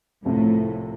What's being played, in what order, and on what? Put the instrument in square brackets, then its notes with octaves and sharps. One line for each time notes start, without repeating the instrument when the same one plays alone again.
[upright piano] C2 C3 F3 A3 [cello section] A2